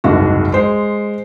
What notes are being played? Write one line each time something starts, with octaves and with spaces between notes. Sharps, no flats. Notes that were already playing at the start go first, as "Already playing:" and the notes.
F#1 C2 G#2 F#4
G#3 C5